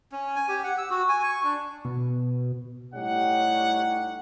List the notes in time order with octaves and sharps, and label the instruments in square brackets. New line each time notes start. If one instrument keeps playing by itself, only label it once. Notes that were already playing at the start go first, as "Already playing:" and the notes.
[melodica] C#4
G#5
G4
F#5
E6
F#4
G#5
C#6
D4
[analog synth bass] B2
[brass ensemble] A2 G3 D#4 G4 C#5 F#5